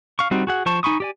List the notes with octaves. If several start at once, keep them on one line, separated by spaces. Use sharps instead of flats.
F5 C#6
G3 C4 D#4 F#4
F#4 G#4 F#5
F3 C5 A5 C#6
D#4 G#5 B5 C#6 D#6
G4 D5 G#5